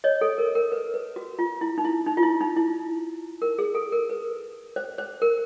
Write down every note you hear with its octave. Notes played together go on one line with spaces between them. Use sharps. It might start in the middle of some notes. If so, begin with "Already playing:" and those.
C#5 D#5
A4
A#4
A#4
B4
B4
F#4
F4
E4
D#4
E4
D#4
F4
E4
D#4
E4
A#4
G#4
A4
A#4
B4
C5
C5
A#4